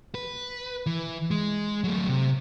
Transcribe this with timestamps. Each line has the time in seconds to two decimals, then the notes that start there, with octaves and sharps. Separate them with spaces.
0.15 B4
0.86 E3
1.31 G#3
1.84 F#3 A3
2.09 C3